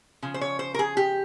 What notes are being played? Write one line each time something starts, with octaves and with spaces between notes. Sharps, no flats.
C#3 F3
C5
C#5
C5
A#4
G#4
G4